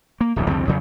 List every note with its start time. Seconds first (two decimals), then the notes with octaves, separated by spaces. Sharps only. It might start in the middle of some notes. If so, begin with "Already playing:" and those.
0.21 A#3
0.36 D1 A#1 E2
0.49 C2 F2 D3 C4
0.67 E2 C#3 F#3